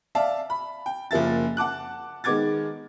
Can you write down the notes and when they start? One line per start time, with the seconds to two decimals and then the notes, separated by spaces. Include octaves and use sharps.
0.15 D5 E5 F5 A5
0.50 B5
0.86 G5
1.11 F#1 F3 A#3 E5 A6
1.57 F#5 A5 D6 F#6
2.24 D#3 G#3 B3 D6 G#6 A6